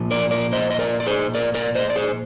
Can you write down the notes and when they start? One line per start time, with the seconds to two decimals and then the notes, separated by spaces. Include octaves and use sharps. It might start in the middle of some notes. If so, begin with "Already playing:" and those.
Already playing: A#2 F3
0.11 A#4 D5
0.31 A#4 D5
0.53 C5 D#5
0.71 D#5
0.79 A#4 D5
1.00 D5
1.07 G#4 C5
1.35 A#4 D5
1.55 A#4 D5
1.75 C5 D#5
1.90 D5
1.96 G#4 C5